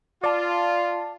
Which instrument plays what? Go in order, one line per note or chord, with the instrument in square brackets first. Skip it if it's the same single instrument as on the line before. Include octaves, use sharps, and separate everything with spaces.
[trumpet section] F4 [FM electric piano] D5 A5